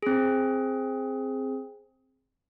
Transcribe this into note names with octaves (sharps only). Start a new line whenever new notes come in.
C4 G#4